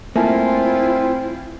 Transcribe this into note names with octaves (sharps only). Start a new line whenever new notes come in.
A3 A#3 C4 E4 F4 E5 G#5 A5